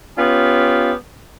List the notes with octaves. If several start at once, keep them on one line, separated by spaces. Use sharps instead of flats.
B3 C#4 F4 G4